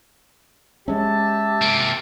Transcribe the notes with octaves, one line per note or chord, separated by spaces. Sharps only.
G#3 C#4 G4 E5 A5
C3 A#3